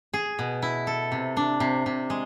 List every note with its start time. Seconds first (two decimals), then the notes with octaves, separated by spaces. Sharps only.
0.14 G#4
0.39 B2
0.62 E4
0.87 A4
1.12 C3
1.37 D4
1.60 C3
1.86 C3
2.10 G#3